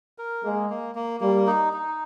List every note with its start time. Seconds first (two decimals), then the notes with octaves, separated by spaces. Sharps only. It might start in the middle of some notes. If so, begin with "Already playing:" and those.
0.18 A#4
0.44 G#3 A#3
0.70 A#3
0.95 A#3
1.21 G3 A#3
1.47 D#4
1.73 D#4